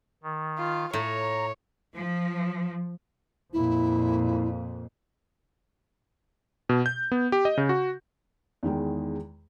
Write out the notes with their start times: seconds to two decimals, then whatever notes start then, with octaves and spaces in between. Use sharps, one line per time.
0.23 D#3
0.58 F4
0.93 A2 C#5 A#5
1.94 F3
3.53 F2 A#2 E4
6.69 B2
6.86 G6
7.12 B3
7.32 G4
7.45 D#5
7.57 C#3
7.69 F#4
8.63 E2 D#3 G#3 G5